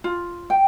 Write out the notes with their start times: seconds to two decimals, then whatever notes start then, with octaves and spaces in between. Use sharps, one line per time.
0.04 F4
0.50 G5